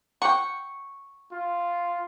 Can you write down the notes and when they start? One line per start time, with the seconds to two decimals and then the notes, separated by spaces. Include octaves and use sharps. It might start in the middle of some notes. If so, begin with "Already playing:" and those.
0.22 F#5 G5 C#6
1.32 F4